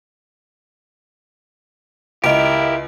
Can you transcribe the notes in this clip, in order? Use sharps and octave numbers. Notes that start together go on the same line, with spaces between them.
C#2 E4 G4 A#4 D#5 D7